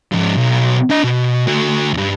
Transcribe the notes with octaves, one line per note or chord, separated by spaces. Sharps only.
G#2 F3
B1
D4 D#5
B2
D3 F#4
E2 G2